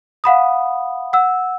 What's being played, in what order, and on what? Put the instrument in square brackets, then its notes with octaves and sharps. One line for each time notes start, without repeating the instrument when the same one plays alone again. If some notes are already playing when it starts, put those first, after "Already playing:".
[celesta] F5 F#5 B5 D#6
F#5 E6